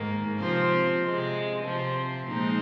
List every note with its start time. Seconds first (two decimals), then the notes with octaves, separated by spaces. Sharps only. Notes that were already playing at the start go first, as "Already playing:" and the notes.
Already playing: G#2 D#3 A#3
0.39 C3 F3 C4 C5
1.02 C3 G#3 C4
1.64 C3 F3 C4
2.27 A#2 F3 G#3 C4 D#4